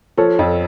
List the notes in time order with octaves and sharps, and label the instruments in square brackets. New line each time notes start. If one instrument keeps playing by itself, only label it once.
[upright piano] F3 [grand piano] A4 C#5
[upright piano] F2